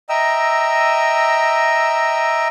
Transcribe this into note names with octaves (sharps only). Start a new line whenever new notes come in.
D#5 E5 G5 A#5 E6